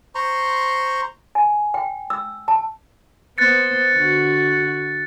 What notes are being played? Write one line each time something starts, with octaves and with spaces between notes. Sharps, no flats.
C5 A#5 C6 C#6
G#5
G5
E6
A5
B3 C5 F#6 A6 C#7
D3 F#4